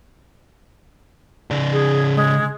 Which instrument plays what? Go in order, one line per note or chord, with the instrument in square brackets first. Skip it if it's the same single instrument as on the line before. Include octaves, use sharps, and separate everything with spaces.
[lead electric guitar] C#3 D5
[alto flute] G#4
G#3